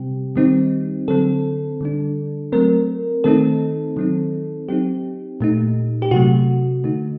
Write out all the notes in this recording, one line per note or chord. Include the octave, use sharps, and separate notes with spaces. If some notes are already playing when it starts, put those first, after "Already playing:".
Already playing: C3 G3 C4 G4
D#3 G3 C4 D#4
D3 F#3 C4 A4
D3 G3 D4
F#3 A3 C4 A#4
D#3 A3 C4 D#4 A4
D#3 F#3 C4 D#4
F#3 C4 D#4 G4
A#2 A3 D#4
G4
C3 F#3 A3 F#4
D3 A3 D#4